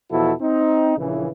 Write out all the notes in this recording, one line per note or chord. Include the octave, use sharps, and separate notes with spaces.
E2 B2 F3 E4 F#4 A4
C4 D#4
A#1 C#3 E3